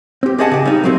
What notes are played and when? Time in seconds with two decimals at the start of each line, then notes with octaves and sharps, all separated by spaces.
0.23 C4 G4
0.38 C4 D4 G#4 D#5 F#5 A5
0.52 C#3 G4
0.65 G3 D#4
0.84 F#3 A3 A#3 C4